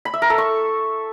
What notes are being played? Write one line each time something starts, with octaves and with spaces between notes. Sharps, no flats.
B5
E5
A#4
A4
C#6